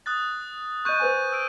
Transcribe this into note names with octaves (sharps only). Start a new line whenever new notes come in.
D#6 F#6 A6
D#5 C#6 F#6 G6 D#7
B4 C5 G#5
E6 D7